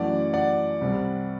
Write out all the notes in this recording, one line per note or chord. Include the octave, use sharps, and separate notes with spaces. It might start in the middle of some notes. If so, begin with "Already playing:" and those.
Already playing: F#2 E3 A3 D5 F#5
D5 F#5
C2 C3 G3